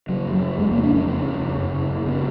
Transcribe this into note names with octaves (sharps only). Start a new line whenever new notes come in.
C#3 F#3
F#2
F#3
C#3
F2 G#3
C#3 A#3
D4
F2 C#4
C#3 C#4
F2
C#3
F#2
C#3
F#2
C#3 B3